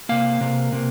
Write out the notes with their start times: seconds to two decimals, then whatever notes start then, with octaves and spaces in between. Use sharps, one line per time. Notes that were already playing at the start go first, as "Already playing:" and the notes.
0.09 C3 A#3 F5
0.41 C3 A#3
0.72 C3 A#3